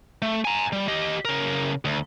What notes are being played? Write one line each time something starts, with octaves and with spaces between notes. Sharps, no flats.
A3
G#5 A#5
G3
G4 D#5
C#3 A#4
D2